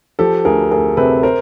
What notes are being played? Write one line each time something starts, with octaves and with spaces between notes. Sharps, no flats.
F3 G4 A4
D2 G#4 A#4
D2 G#4 A#4
C3 A4 B4
A#4 C5